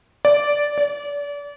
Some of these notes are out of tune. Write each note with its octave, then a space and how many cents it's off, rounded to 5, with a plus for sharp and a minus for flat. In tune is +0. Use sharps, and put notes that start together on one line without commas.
D5 -10
D5 -35